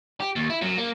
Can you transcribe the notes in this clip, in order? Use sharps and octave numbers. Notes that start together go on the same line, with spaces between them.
G4
D#2
E4
F#2 F#3
A#3